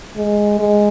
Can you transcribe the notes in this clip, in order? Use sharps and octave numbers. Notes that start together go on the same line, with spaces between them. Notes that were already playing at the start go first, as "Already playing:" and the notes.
G#3
G#3